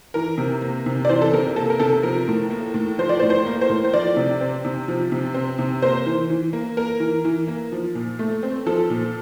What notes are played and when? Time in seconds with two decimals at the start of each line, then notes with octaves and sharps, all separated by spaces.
0.14 E3 A#4
0.38 C3
0.61 A#3
0.86 C3
1.05 D5
1.09 E3 C5
1.22 A4
1.33 C3 A#4
1.56 A#3 A4
1.70 A#4
1.80 C3 A4
2.03 F3 A#4
2.28 A2
2.50 A#3
2.74 A2
2.98 F3 C5
3.09 D5
3.19 C5
3.23 A2
3.30 C5
3.46 A#3
3.61 C5
3.69 A2
3.84 C5
3.93 F3 D5
4.16 C3
4.41 C4
4.65 C3
4.88 F3
5.12 C3
5.34 C4
5.59 C3
5.82 A#3 C5
6.06 E3
6.30 E3
6.53 A#3
6.77 A#3 A#4
7.00 E3
7.25 E3
7.48 A#3
7.72 F3
7.95 A#2
8.19 A3
8.43 C4
8.66 F3 A4
8.90 A#2